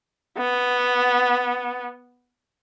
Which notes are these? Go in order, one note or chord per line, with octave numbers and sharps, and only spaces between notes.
B3